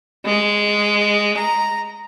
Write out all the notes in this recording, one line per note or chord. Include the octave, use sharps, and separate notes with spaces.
G#3
A#5